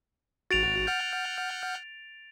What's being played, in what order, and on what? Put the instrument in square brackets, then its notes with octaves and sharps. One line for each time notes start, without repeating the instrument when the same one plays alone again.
[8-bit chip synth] G#1 F#4 [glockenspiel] A6 D7 F7
[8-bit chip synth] F#5 F6 G6